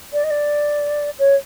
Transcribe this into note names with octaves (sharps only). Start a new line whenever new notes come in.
D5
D#5
D5
C#5